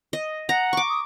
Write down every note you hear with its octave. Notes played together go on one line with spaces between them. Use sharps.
D#5
F#5 A#5
C#6 D6
D#6